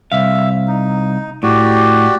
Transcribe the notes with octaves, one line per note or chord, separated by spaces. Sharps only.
C2 E5 F5
D#4
A2 F#4 G4 D5